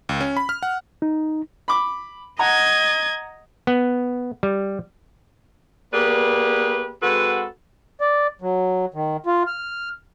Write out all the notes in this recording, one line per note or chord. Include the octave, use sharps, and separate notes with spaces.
C#2
C#4
B5
F6
F#5
D#4
B5 D6
D#5 F#5 A#5 G#6
B3
G3
A#3 B3 G4 G#4 B4 D5
G#3 C4 F#4 A4 B4 F#5
D5
F#3
D#3
F4
F6